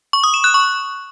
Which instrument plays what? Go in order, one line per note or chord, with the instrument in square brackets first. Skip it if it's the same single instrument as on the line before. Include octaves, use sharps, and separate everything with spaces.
[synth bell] C#6
D#6
E7
F#6
C#6